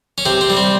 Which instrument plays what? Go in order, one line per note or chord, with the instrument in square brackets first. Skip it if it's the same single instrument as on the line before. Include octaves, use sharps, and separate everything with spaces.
[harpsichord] C#4
C3 C4
C4
G3
C4